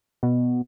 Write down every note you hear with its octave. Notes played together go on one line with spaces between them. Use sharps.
B2